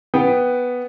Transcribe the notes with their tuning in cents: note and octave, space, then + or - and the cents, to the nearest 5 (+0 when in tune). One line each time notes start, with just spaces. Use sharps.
B3 +0 B4 +0 G5 +0